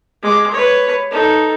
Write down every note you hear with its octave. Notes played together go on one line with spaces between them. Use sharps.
G#3 D6
B4 C#5
D#4 A4